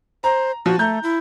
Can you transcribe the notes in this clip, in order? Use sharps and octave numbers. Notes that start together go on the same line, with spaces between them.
C5 A#5
F3 F#4
A3 A#5 G6
E4